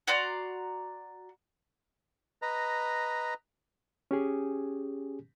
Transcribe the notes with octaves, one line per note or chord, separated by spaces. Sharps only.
F#4 D5 A#5 C6
B4 D#5 A#5
C#4 G4 G#4